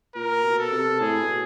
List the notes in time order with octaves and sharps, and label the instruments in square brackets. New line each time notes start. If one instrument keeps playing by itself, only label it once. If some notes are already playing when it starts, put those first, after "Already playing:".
[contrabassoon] A#2 [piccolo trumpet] A#4
[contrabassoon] B2
[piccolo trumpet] A4
[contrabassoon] C3
[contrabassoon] A2 [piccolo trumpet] G#4
[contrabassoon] B2